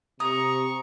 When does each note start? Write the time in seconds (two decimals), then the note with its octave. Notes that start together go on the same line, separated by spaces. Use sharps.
0.20 C3 A#5 C#6 D#6